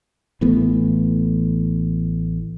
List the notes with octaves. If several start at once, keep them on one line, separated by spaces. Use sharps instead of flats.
A1 E3 A3 B3